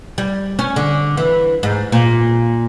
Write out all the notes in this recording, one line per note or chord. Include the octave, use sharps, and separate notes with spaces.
G3
C#4
D3
E3
G#2
A#2